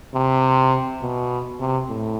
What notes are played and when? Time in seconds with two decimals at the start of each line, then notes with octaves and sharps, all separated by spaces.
0.14 C3
1.02 B2
1.60 C3
1.88 A2